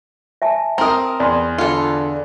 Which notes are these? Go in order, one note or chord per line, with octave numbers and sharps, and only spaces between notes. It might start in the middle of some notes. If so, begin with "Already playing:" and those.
E5 G#5 A5
C4 A#4 A#5 D#6
E2 D5 C6
D3 F4 A4